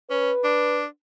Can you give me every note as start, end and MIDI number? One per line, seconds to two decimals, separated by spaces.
0.11 0.31 61
0.11 0.82 71
0.44 0.85 62